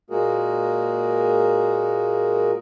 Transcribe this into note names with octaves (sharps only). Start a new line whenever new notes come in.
A#2 G#3 A#3 F#4 G#4 A#4